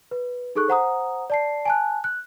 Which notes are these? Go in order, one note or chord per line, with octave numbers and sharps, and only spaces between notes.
B4
D#4 G#4 A4 C#6 F#6
C5 F#5 A#5 D#6
D5 A5 C7
G#5 A5 F#6
F#6